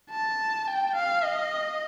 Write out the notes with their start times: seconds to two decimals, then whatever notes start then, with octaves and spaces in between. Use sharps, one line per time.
0.11 A5
0.68 G5
0.96 F5
1.24 D#5